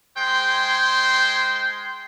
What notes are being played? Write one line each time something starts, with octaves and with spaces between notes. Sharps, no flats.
G#3 C5 G5 C6